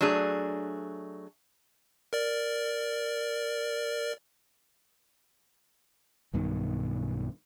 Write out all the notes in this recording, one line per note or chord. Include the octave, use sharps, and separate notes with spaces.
F#3 A3 D4 G#4
A#4 D5
B1 G2 B2 D#3